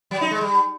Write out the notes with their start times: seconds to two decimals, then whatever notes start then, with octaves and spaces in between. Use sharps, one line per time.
0.11 F#3
0.21 D#4
0.31 G#3
0.41 G3